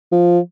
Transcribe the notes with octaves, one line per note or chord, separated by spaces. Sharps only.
F3